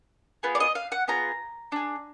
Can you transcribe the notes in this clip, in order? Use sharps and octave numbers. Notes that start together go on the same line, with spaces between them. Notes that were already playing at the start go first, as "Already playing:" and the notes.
B3 F4 G#4
D5
D#5
F5
F#5
B3 F4 G#4 A#5
D4 G#4